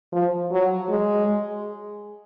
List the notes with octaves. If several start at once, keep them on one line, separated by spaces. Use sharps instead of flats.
F3
F#3
G#3